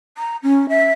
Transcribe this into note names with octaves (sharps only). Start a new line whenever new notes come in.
A#5
C#4
E5